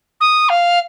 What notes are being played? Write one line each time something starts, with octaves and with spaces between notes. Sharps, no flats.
D#6
F5